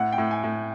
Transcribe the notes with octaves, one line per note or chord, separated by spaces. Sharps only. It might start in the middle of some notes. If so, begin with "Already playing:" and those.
Already playing: A2 F#5
G5
A2
G#5
A2